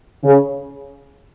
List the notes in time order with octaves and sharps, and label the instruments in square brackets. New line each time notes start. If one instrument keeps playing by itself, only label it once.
[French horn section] C#3